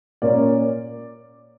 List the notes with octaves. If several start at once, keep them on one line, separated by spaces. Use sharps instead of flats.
A#2 A#3 C#4 D5